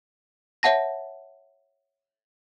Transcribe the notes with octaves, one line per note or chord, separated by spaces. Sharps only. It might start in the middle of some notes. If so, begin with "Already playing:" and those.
C#5 E5 F#5 A5 A#6